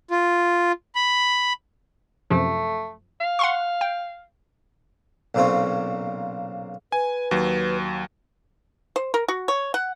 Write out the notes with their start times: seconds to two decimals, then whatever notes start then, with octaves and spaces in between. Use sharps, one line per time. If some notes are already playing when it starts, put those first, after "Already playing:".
0.11 F4
0.95 B5
2.30 F#2 C3 F3 A3
3.21 F5
3.39 F#5 C6 C#6
3.81 G5
5.35 B1 A#2 C#3 C4 F4 C#5
6.92 B4 G#5
7.31 D#2 F#3
8.96 C5
9.14 A#4
9.28 F#4
9.48 C#5
9.74 F#5